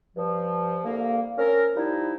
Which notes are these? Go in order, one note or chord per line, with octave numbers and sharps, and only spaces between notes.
G2 F3
C2 D3 A#3
C4 C#4 A#4
F3 G3 D#4 E4